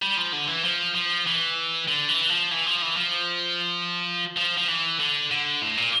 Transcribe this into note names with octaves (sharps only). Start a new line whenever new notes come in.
G3
F3
D3
E3
F3
F3
E3
D3
E3
F3
E3
F3
E3
F3
F3
F3
E3
D3
D3
A2
A#2